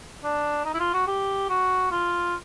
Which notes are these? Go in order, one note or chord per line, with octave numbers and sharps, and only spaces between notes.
D4
D#4
E4
F4
F#4
G4
F#4
F4